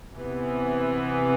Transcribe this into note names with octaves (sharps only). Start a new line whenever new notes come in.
C3 E3 B3